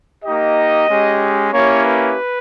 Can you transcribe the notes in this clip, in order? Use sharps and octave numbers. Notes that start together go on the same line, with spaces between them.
A#3 D#4 G4 D#5
G#3 C#4 G4
A#3 C#4 E4 G4 C#5
B4